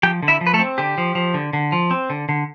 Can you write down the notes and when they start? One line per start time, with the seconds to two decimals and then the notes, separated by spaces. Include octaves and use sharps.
0.03 F3 G4 G5
0.23 D3
0.28 E4 E5
0.41 F3
0.47 B4
0.53 A3 A4
0.60 C4
0.78 D3 G4
0.98 F3
1.15 F3
1.34 D3
1.53 D3
1.72 F3
1.91 C4
2.10 D3
2.29 D3